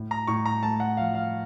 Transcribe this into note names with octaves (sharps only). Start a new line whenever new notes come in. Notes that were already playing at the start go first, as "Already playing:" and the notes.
Already playing: A2
A#5
A2 C#6
A#5
A3 A5
F#5
F3 F5
F5